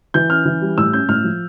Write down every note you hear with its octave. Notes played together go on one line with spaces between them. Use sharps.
E3 G6
C#4 F6
E3
G3
A2 E6
C#4 G6
A2 F6
F3